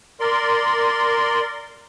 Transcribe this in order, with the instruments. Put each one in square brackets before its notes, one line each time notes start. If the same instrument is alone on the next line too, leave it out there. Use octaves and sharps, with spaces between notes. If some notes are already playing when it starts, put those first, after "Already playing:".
[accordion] A#4 D5 C6